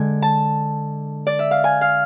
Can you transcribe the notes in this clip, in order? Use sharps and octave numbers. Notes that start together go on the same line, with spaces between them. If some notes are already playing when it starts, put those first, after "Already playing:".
Already playing: D3 G#3 G#5
A5
D5
E5
F5
G#5
F5